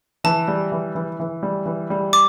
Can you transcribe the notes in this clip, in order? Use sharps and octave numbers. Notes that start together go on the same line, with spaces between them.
E3 A5
G3
E3
E3
E3
G3
E3
G3
D6